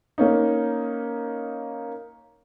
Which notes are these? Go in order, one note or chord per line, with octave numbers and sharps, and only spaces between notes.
A#3 C#4 D#4